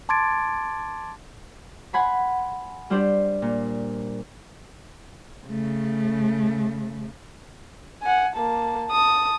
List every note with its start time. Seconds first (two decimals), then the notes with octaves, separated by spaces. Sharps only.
0.09 A5 C6 D6 G#6 A6 D7
1.93 F#5 G#5 B5 C6
2.90 G3 D4 G4 C5 D5
3.42 A#2
5.48 C#3 A3
8.02 F#5 G#5
8.35 A#3 A5
8.89 A5 D#6